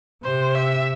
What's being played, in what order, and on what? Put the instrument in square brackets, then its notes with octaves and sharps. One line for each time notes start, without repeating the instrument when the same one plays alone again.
[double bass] C3 [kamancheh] C5
[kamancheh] E5